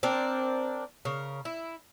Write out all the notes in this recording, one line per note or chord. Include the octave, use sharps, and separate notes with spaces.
C4 D4 A#4
C#3 A#4
E4